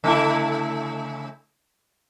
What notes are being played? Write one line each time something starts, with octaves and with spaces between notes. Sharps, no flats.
C#3 A3 E4